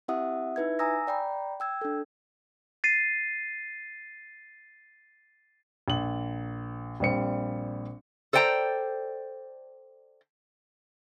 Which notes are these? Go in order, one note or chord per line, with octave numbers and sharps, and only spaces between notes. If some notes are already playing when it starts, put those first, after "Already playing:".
C4 E4 G4 E5 F#5 D#6
D#4 E4 B4 E5 G#6
G#5 A#5 D#6 E6 A#6
D5 G5 A#5 B5
G5 E6 G#6
D4 A4
A6 C7 D#7
A#1 F#7
A#1 G3 C4 C#7
A4 C5 D5 G5 G#5 A#5